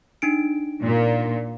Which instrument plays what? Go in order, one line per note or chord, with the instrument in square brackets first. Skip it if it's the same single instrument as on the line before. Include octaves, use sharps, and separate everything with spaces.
[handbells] D4 D#4 D7
[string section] A#2